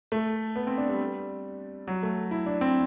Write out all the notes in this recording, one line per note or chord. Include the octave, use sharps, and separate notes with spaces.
A3
B3
C4
D4
G3
F#3
A3
E4
D4
C4